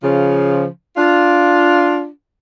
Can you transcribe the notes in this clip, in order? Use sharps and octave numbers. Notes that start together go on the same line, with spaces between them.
C#3 F3
D4 F4